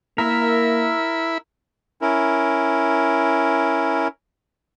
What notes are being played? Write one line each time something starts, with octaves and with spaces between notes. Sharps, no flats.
A#3 E4 A#4 E5 B5
C#4 E4 A#4